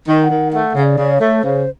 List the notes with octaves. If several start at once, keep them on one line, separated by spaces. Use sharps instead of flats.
D#3
F#5
D#3
A3 F#5
C#3
D5
C#3
C#5
A3
C#3 C5